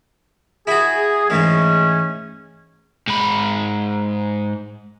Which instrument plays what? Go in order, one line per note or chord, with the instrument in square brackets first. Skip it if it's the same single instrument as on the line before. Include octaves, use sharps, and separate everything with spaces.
[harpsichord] E4 F#4 [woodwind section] G#4
[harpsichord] G#2 E3 [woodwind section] G#3 A3 C#4
[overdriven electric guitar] G#2 B5